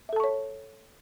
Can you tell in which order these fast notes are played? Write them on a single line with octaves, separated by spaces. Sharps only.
E5 A4 A5 C#6 C#5